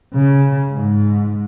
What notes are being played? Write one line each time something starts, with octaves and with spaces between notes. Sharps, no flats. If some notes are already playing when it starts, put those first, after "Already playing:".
C#3
G#2